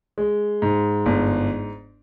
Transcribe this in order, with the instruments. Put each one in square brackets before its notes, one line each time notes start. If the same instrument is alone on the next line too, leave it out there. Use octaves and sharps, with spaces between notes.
[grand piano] G#3
G#2
G1